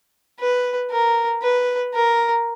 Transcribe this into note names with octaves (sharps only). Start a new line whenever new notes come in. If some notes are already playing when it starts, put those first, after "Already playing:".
B4
A#4
B4
A#4